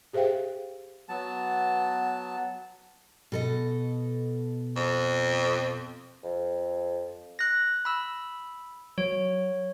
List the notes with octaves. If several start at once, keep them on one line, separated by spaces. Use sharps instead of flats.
G4 G#4 C5 E5 F5 G5
F#3 B3 A5
B2 A4 D#5
F2
F2
F#6 A#6
B5 E6
F#3 C#5